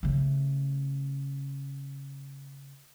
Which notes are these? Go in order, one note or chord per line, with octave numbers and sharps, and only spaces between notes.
C#3 A3